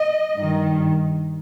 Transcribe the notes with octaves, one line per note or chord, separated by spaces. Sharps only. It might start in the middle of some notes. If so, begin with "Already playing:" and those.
Already playing: D#5
G2 D#3